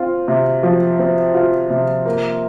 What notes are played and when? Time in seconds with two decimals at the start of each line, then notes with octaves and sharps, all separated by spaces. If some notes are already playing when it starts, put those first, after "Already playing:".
Already playing: C4 F4
0.28 C3
0.63 F3
0.99 C4
1.34 F4
1.70 C3
2.06 A#3